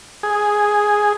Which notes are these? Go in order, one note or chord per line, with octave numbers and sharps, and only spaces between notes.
G#4